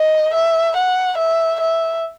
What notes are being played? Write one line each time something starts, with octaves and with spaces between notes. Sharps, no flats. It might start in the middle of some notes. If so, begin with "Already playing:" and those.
Already playing: D#5
E5
F#5
E5
E5